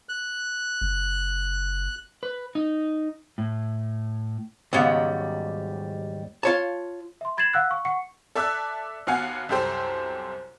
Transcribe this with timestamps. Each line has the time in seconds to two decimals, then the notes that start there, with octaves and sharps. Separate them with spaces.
0.09 F#6
0.81 F#1
2.23 B4
2.55 D#4
3.38 A2
4.73 D#2 G#2 C#3 F#3 G3 B3
6.43 F4 C#5 A5
7.21 E5 C6
7.37 B5 G#6 A6 C7 E7 F#7
7.53 F5 F#5 E6 F#6
7.71 C#6
7.85 F#5 C#6 C#7
8.35 A4 D5 E5 A5 E6 F#6
9.07 D#2 B3 F#4 F5 F#5 G#5
9.49 C2 F#2 G4 A4 C5